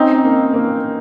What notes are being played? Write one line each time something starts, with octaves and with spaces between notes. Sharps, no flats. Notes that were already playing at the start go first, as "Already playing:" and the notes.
Already playing: C4 C#4 D#4
A#3
A#3